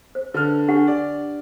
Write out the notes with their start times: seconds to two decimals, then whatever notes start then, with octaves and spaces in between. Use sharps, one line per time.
0.15 C5
0.34 D3 B4 F6
0.68 D4 G4 F#5
0.87 D5